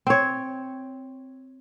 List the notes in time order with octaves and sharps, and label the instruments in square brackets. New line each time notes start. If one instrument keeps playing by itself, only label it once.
[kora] C4 C#5